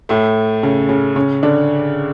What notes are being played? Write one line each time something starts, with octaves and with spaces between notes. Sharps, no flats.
A2 A3
C#3 C#4
C#3 C#4
C#3 C#4
D3 D4